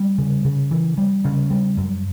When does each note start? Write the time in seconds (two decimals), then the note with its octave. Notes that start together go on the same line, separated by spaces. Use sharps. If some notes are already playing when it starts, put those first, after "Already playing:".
Already playing: G3
0.18 C#3
0.45 C#3
0.71 E3
0.98 G3
1.25 C#3
1.50 G3
1.77 F#2